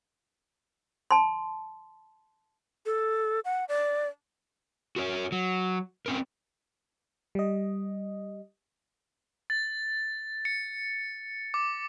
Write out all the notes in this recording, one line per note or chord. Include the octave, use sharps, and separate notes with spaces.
A5 C6
A4
F#5
D5
F#4 A#4 C#5
F#3
C4 C#4 A#4
G3 D#5
A6
C#7
D6